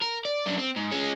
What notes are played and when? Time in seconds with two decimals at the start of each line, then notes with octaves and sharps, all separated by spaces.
0.01 A#4
0.25 D5
0.46 F#2 D4
0.58 C4
0.76 G#2
0.92 G#3 C#4